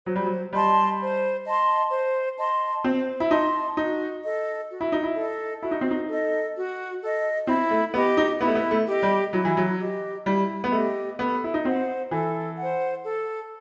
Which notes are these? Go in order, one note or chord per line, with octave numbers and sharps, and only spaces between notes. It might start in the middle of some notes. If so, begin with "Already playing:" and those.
F#3 C5
G3
F#3
G3 D#5 A5 C6
C5
D#5 A5 C6
C5
D#5 A5 C6
C4 C5
E4
D#4 D#5 A5 C6
D#4 F#4
A4 D#5
F#4
E4
D#4
E4
A4 D#5
E4 F#4
D#4
C4
D#4
A4 D#5
F#4
A4 D#5
C4 E4
A3
B3 G4 D#5
D#4
B3 E4
A3
B3
A3
G4 D#5
G3
F#3 E4
E3
F#3
G4 D#5
G3 E4
B3
A3 G4 D#5
B3 A4
E4
D#4
C4 C5 F#5
E3 A4
C5 F#5
A4